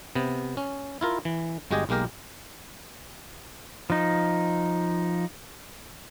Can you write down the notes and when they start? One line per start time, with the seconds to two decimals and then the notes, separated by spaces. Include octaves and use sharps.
0.15 C3 B3
0.57 C#4
1.01 E4 F4 A#4
1.25 E3
1.71 G1 G#3 F#4 G4 D#5 G#5
1.89 B1 G#3 A#3 G4 A#4
3.90 F3 D#4